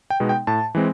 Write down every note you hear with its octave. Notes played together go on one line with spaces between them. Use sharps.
G5
B2 G#3 B3 D#4
G5
A2 A5
E3 G#3 C4